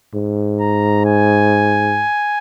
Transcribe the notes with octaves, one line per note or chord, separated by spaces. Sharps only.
G#2
A#5
G#5